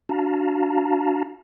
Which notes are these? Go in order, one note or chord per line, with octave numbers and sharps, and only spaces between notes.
D4 F#4 F5 A5 A#5